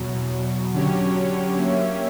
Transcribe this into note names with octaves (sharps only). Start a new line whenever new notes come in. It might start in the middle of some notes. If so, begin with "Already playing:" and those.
Already playing: E2 B2 F#3
D3 F#3 C#4 G4 C#5
A#3 C#4 G4 C#5 E5